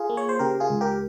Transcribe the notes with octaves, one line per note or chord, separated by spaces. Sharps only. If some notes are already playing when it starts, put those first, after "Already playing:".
Already playing: F4 G#4
A#3
C#5
C5
C#3 G4 A#4
F4 G#4
C#2
G4 A#4